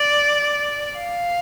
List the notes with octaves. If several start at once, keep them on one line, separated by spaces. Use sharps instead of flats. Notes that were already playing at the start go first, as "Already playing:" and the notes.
Already playing: D5
F5